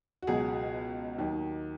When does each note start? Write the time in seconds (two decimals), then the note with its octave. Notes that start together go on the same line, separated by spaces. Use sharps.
0.22 F#4
0.27 C#2 B2 F#3 G#4
1.18 D#2 D#3 F#3